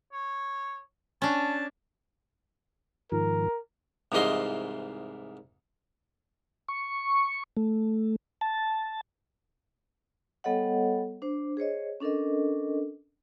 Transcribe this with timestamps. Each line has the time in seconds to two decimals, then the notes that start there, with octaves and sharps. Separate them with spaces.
0.13 C#5
1.22 C#4 D4 A5
3.12 G#2 D#3 F3 A#4
4.12 C2 G#2 E3 F4 D#5 C6
6.68 C#6
7.57 A3
8.41 A5
10.44 G3 B3 A4 C#5 D#5 F#5
11.22 D4 C5
11.57 G#4 C5 C#5 D#5
12.00 C#4 D4 A4 A#4 D#5